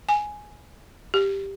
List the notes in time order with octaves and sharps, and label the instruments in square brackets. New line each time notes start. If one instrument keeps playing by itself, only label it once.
[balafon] G#5
G4